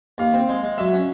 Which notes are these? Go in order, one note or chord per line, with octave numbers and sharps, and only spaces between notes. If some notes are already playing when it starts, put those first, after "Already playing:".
D#2 F5
C4
G#3
G#3
F#3 E5
C#4